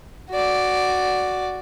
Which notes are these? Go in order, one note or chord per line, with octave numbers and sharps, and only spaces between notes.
F#4 D5